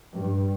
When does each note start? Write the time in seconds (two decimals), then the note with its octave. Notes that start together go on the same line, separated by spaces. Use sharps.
0.15 G2